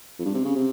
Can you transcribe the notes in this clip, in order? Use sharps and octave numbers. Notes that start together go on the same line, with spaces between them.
F2
G2
C3
C#3
C3